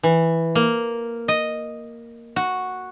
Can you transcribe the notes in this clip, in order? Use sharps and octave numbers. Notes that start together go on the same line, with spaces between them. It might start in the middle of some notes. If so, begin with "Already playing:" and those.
E3
A#3
D#5
F#4